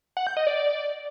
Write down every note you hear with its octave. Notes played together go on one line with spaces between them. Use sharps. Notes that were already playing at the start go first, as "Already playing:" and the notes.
F#5
G6
D#5
D5